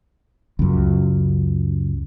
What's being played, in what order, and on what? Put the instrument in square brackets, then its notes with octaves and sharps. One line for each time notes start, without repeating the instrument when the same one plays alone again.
[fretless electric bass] C#2 F#2